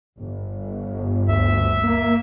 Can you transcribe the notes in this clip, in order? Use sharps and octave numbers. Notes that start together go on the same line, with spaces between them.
G1
D2 E5
A#3